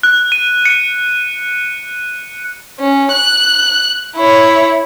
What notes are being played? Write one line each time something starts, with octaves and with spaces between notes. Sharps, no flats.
F#6
D#7
C#7
C#4
F#6
E4 C#5